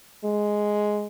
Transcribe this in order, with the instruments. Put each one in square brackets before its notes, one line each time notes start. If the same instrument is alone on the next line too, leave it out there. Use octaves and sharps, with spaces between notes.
[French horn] G#3